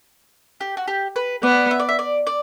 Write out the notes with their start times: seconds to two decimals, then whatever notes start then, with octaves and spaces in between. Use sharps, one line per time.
0.61 G4
0.77 F#4
0.88 G4
1.16 B4
1.43 B3 D5
1.71 E5
1.80 D5
1.89 E5
1.99 D5
2.27 D5